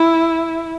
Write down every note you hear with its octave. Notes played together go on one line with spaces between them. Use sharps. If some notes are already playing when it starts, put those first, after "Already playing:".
Already playing: E4